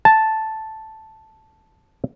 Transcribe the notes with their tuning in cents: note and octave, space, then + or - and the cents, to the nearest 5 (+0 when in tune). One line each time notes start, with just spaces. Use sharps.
A5 +0